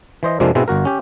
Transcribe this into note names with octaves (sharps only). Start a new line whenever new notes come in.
E3 C5 D#5
F2 C3 F3 G#3 A#3 D4
G#2 B2 G#3 C4 E4
G1 F#4 A#4
C#4 G4